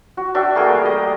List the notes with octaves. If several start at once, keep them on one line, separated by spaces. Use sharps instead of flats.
F#4
D4 F#4 E5 G5
A3 A#3 G#4 G5
G3
D#5 G5